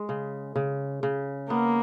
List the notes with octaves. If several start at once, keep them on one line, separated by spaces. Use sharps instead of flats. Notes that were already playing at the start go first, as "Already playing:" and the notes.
Already playing: G#3
C#3
C#3
C#3
A#3 B3